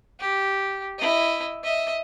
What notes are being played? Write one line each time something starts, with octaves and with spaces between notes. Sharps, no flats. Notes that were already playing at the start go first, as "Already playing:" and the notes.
G4
E4 D#5
D#5 E5